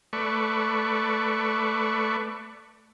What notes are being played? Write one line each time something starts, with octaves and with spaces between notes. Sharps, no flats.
A3 B4 D5 C#6